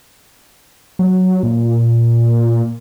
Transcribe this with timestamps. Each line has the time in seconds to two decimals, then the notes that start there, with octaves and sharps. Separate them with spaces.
0.99 F#3
1.43 A#2